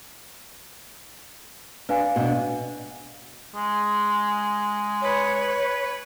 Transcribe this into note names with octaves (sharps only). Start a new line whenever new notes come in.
D4 B4 F5 G#5
B2 D4
G#3
B4 C#5